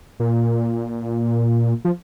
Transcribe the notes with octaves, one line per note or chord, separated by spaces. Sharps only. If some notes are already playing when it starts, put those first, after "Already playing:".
A#2
F3